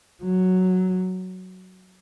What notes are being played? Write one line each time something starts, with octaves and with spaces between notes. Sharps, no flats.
F#3